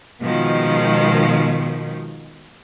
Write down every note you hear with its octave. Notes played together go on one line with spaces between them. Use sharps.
B2 D#3 F3 G#3